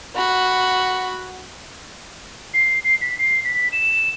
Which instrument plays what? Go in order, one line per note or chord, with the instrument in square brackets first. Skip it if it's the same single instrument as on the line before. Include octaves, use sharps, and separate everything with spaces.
[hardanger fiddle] F#4 B5
[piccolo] C7
C7
B6
C7
B6
E7